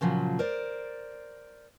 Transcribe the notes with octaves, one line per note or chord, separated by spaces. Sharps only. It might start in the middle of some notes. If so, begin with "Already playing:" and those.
A#2 C#3 F3 F#3
A#4 C5 D5